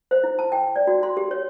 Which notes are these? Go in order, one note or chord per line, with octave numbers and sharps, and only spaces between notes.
C5
E4
A5
G5
D5
F#4
C6
G4
C#5